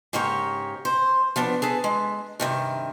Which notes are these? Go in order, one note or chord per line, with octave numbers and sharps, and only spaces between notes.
G#2 C#3 A#3 G4 C#5
C5
F3 B3 D4
G#4 A4 B4
G#3
G2 C3 D#3